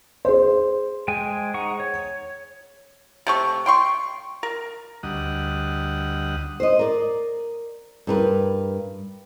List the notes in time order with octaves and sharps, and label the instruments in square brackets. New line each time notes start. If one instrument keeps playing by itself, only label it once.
[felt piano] G#4 C5
[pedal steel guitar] G#3 G5 G#5
D#4 F#5 C#6
C#5
[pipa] C3 A3 C#6
G5 C6 C#6
A#4
[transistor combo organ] D2 G3 D#5 F#5
[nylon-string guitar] C5 D#5
A#4 D5
G2 A#4 B4